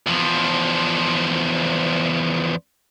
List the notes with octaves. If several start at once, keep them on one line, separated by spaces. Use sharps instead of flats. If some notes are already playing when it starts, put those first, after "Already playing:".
E2 F3